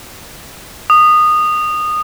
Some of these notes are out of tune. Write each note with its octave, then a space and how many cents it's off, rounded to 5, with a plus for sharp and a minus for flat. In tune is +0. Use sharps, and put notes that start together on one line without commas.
D#6 -20